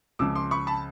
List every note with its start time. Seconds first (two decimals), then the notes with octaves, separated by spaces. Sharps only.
0.19 C#2 C#3 F3 D6 E6
0.35 C6 D6
0.51 B5 C#6
0.67 A5 B5